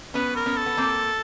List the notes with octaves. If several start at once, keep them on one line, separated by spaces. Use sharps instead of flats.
B3 C#4 B4
A#4
B3 C#4
A4
B3
A#3 C4